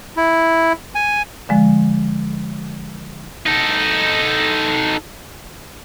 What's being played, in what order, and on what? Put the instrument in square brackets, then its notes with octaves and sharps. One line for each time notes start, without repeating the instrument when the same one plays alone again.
[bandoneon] E4
G#5
[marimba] D3 F3 G#3
[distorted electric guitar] D#4 A4